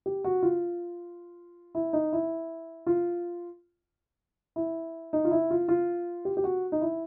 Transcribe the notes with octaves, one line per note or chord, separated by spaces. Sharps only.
G4
F#4
F4
E4
D#4
E4
F4
E4
D#4
F4
E4
F4
F4
G4
G4
F#4
D#4
E4